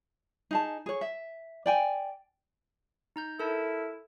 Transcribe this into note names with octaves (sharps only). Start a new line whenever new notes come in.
D#4 G#4 A5
G#4 C#5
E5
D5 G5 G#5
D#4 A#5 G6
E4 A4 A#4 A5